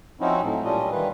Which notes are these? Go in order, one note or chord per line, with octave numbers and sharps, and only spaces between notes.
F3 C4 C#4 D#4 E4 F#4
A2 F#3
A#2 G3 C#4 D4 F4 D#5
D#3 E3 G3 A#3 B4